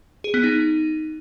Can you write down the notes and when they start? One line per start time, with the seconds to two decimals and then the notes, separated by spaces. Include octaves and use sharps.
0.24 G#4
0.34 B3
0.43 D#4